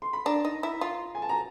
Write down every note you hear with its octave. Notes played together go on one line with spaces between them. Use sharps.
C6
B5
D4 A#5
D#4
E4
F4
G#5
A5
A#5